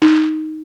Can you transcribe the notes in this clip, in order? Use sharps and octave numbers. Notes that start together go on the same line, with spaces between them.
D#4